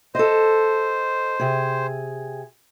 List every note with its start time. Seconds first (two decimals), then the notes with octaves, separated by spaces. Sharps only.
0.15 A4 C5 D#5
1.39 C3 G#4